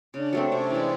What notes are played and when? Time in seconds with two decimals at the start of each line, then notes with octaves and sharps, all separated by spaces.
0.14 C#3 D4 D5
0.33 F#3 A3 C4
0.52 C3 C#4 C#5
0.70 E3 G#3